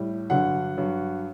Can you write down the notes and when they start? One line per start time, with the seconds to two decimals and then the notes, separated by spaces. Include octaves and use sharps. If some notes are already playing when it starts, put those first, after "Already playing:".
Already playing: A2 G3
0.30 G2 D3 F#3 F#5
0.77 G2 F#3